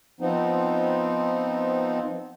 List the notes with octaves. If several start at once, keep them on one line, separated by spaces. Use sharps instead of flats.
F3 B3 C4 D#4